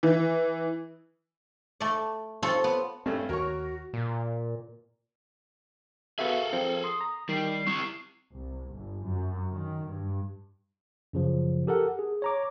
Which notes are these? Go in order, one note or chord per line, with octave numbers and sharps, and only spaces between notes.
E3
A3 D5
C4 F4 A4 C#5
B3
G2 A3 C4 C#4
D#2 F#4 A#4 C#5 C#6
A#2
B3 F#4 G#4 A4 E5 F5
F3 C4
C6 D#6
A#5
D#3 G3 C7
C4 E4 C#6
C2
G1
F#2
D#3
G2
F#2 C#3 F3
G4 A4 A#4 F#5
G#4
C#5 A#5 D6